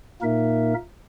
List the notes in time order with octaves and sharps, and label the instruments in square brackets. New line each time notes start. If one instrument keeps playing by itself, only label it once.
[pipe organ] A#2 A#3 D#4 A#4 E5